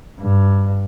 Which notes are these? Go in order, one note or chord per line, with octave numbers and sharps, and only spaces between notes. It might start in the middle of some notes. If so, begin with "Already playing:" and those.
G2